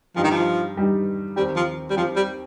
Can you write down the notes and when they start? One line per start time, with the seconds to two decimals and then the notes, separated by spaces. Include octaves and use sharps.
0.16 G2 F3 G3 D#4 G4
0.24 D#3
0.31 F3
0.76 G2 G3 D#4 G4
1.36 D#2 D#3 G3 C4 G4
1.56 F3
1.90 G3
1.96 D#2 D#3 F3 C4 G4
2.16 G3